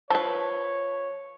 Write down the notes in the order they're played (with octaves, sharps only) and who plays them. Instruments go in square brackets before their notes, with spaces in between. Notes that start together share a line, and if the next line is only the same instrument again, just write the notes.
[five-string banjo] F3 B4 [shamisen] A4 [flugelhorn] C#5